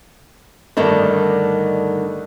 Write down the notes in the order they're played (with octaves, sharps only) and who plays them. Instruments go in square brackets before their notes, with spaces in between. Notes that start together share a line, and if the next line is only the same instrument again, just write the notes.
[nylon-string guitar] G2 D3 D#3 [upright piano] A3 D4 D#4